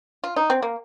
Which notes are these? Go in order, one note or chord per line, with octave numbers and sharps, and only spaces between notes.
F4
D#4
C4
A#3